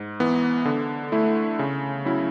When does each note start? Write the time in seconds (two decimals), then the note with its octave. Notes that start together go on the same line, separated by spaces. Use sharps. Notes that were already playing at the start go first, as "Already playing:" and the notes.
Already playing: G#2
0.20 E3 B3
0.65 D3
1.12 A3 E4
1.59 C#3
2.05 F#3 C#4 E4